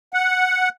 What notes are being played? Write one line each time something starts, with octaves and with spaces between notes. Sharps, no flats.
F#5